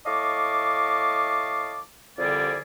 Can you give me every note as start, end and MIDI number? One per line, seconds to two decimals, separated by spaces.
0.06 1.81 45
0.06 1.81 75
0.06 1.81 77
0.06 1.81 81
0.06 1.81 85
0.06 1.81 86
2.18 2.59 36
2.18 2.59 41
2.18 2.59 50
2.18 2.59 55
2.18 2.59 68
2.18 2.59 74